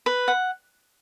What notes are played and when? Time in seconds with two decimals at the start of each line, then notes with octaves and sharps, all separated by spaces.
0.06 B4
0.28 F#5